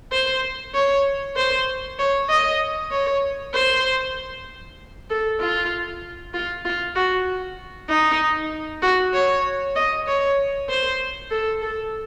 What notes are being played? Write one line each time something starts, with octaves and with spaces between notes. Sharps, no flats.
C5
C#5
C5
C#5
D#5
C#5
C5
A4
F4
F4
F4
F#4
D#4
F#4
C#5
D#5
C#5
C5
A4
A4